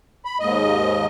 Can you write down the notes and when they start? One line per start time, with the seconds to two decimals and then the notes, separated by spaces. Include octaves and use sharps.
0.25 B5
0.40 D#2 G#2 D#5